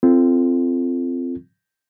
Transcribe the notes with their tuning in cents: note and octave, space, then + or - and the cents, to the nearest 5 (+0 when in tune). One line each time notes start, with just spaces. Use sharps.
C4 +0 F4 -25 A4 +0